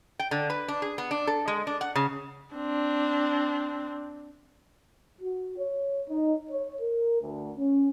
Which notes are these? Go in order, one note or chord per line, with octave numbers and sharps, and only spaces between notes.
G5
D3
B4
D4
G#4
B3
D4
A4
G#3
D4
F#5
C#3
C4 D4
F#4
C#5
D#4
C#5
A#4
D2
C#4